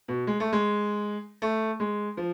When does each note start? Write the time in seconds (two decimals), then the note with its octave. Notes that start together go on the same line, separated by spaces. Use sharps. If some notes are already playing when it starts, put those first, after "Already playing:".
0.08 B2
0.27 G#3
0.40 A3
0.53 G#3
1.42 A3
1.80 G#3
2.17 F3